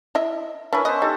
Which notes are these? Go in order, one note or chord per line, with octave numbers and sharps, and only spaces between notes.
E4 D#5 E5
C#4 D4 E4 A#4 B4 E5
B3 C#4 C5 D#5
D#4 G4 A4